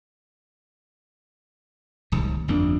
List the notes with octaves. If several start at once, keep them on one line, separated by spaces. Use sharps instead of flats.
D1 C2 C3 D#3
G1 F2 A#3 D4